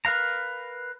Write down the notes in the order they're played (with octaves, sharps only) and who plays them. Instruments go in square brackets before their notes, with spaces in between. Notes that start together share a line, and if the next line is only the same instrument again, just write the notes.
[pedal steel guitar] A#4 B4 F5 A#5